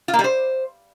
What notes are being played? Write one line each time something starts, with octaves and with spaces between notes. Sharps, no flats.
F4
A#3
G3
C5